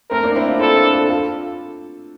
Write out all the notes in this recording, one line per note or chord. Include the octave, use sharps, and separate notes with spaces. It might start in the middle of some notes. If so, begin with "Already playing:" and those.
A3 C4 A#4
A#3 D4
C4 E4
D4 F4
C4 E4 A4
D4 F4
F4 A4
F4 A4